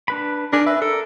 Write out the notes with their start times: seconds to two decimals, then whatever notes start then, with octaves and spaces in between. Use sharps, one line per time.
0.08 D4 B4 B5
0.53 D4 D#4 G#4 A#4
0.66 B4 E5
0.82 A4 A#4